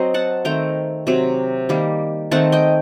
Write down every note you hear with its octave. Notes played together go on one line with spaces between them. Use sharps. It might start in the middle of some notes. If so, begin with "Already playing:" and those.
Already playing: F#3 C4 C5 D#5
F#5 A5
D#3 A3 C4 G5 A#5
C3 F#3 C4
D#3 G3 A#3
D#3 A3 C4 F#5 A5
D#5 G5